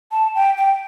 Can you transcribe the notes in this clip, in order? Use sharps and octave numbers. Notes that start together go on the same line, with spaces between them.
A5
G5
G5